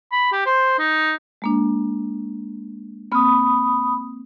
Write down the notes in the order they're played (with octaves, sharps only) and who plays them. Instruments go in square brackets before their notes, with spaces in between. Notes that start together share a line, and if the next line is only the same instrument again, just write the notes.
[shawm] B5
G4
C5
D#4
[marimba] G#3 A#3 D4
[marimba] A#3 C4 F6 [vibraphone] B5 D#6